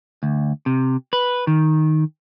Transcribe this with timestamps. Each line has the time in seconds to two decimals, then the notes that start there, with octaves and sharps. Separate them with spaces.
0.23 D2
0.66 C3
1.13 B4
1.47 D#3